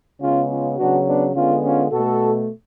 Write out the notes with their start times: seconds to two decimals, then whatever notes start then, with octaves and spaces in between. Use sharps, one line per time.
0.21 C#3 G#3 B3 C#4 F4
0.49 C#4 F4
0.78 C#3 F#3 B3 D4 F#4
1.06 B3 D4
1.35 D3 G#3 B3 C#4 F4
1.63 C#4 F4
1.91 B2 A3 F#4 A4